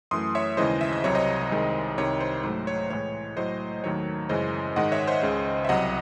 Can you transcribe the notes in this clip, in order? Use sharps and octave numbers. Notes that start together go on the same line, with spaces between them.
F#2 E3 A3 C6 D#6
C#5 E5
D#2 C#3 E3 G#3 C5 D#5
E5
D#5
C2 C3 F#3 C#5
C5 D#5
C2 C3 D#3 G#3
C2 C3 D#3 C#5
C5
G#2 F#3 A3 C5
C#5
A2 E3 G#3 C#5
A2 F#3 A3 C5 D#5
D#2 D#3 F#3 A3 C#5
F#2 C#3 E3 G#3 C5 D#5
G#2 D#3 G#3 D#5 F#5
C#5 E5
C5 D#5
C#2 C#3 G#3
E5
C2 C3 F#3 D#5 F#5